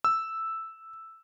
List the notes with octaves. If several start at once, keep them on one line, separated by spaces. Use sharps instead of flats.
E6